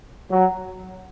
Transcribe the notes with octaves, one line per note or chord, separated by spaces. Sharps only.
F#3